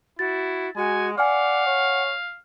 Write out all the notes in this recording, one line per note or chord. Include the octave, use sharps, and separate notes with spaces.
E4 F#4 A6
G#3 F#4 G#5
D5 F5 F#5 G#5 F6
C#5